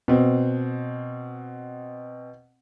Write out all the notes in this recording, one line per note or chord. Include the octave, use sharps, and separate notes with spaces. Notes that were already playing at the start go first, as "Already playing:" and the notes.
B2 C4